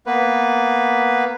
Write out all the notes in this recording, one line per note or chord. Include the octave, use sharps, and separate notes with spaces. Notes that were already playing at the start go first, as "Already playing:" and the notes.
A#3 B3 B4